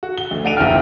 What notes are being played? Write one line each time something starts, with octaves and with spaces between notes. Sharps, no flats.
F#4
G7
D2
A3 D4 F#5 D7 D#7 F7
F#1 D#2 A#2 E4 G5 F6